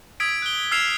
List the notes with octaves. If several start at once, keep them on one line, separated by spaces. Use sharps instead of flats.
D#6 E6 G#6 B6 D7
F#6 G7
E6 F6 G#6 C7 E7 F7